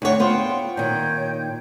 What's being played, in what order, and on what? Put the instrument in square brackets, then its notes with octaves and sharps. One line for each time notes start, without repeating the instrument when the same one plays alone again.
[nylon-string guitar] D2 C#5 [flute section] D4 F#5 G5
[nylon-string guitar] B3 F4 C5 [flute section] F#5 G5 C6
[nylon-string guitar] A#2 D#3 [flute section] C#5 G5 G6